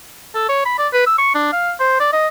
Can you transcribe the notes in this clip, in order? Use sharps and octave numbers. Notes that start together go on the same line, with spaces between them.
A4
C#5
B5
D5
B4
E6
C#6
D4
F5
C5
D5
D#5